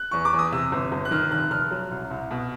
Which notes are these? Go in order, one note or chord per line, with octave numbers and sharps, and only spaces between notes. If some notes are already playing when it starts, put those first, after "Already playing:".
Already playing: F#6
E2 C#6
D6
E2
D#6
C3 E6
G1
G1
F#6
D#3 F6
F1 F#6
F1 F6
F#3
C2
C2
B2